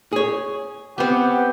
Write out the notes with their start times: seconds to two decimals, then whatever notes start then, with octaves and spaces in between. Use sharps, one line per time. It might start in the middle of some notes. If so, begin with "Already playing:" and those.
0.13 G#4 C#5
0.98 B3 C4 G4 F#5